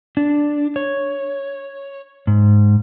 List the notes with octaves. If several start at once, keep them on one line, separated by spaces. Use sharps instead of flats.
D4
C#5
G#2